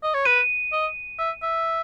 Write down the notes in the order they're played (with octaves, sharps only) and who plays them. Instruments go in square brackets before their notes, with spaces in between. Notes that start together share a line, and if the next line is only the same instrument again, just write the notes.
[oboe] D#5
C#5
[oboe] B4 [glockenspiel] D#7
[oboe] D#5
E5
E5